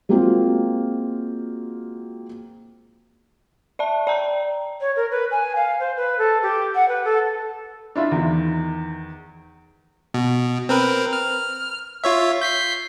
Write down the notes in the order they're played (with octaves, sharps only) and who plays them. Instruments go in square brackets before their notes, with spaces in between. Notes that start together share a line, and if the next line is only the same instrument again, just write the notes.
[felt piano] G#3 A#3 C4 F4 F#4
[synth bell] D5 E5 A5
D5 G5 A#5
[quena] C#5
A#4
B4
G#5
F5
C5
B4
A4
G4
F#5
B4
A4
[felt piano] D4 E4 F4 E5
E2 D#3
[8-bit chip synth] B2
C4 A#4 B4
F6
F4 C#5 E5
G6 B6 C7